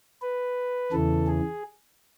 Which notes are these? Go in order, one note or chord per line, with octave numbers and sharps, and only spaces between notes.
B4
E2 C#3 E3 A4
G#4